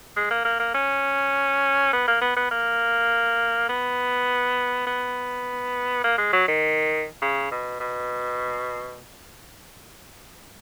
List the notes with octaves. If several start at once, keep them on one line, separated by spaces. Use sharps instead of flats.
G#3
A#3
A#3
A#3
C#4
B3
A#3
B3
B3
A#3
B3
B3
A#3
G#3
F#3
D#3
C#3
B2
B2